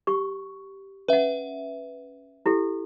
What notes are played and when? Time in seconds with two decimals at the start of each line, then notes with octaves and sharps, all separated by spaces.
0.07 G4 C#6
1.08 C#4 B4 E5 F#5
2.46 E4 G4 A4